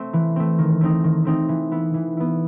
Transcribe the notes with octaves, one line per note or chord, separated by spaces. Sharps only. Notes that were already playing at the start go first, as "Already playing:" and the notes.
Already playing: A3 C4
E3
A3 C4
D#3
A3 C4 D#4
D#3
A3 C4 D#4
E3
B3 E4
E3
B3 E4